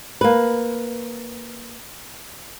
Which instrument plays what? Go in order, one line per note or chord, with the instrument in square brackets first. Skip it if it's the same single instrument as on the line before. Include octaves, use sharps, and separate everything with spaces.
[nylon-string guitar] A#3 B4